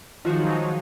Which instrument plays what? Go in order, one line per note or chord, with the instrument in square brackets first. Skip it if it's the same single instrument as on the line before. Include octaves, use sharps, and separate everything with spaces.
[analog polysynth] D#3 F3 F#4 [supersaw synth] F#3 G#3 D#4 [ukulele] F4